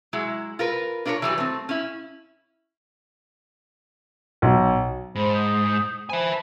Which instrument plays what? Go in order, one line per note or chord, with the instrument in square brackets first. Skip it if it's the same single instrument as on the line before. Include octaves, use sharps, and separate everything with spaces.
[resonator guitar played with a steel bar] F#3 G#3 E4
F4 A#4 B4
D4 F4 A#4 C5 C#5
E3 F#3 G3 B4
A3 C4
C#4 E4
[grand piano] B1
[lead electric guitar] G#2 [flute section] C5 A5 B5
[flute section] D#6 G6
[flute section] C5 A5 B5 [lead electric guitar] E5 G#5